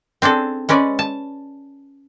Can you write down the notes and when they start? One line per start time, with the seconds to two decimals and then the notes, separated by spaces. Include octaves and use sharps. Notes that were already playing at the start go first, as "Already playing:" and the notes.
0.22 C4 D4 G#4 A4
0.69 G#3 C#4 B4 D5
0.99 A5